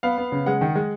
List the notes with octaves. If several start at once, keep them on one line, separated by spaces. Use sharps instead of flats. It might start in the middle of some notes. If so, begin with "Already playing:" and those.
B3 F5
B3
C#3
G#3 F#5
D#3
G#3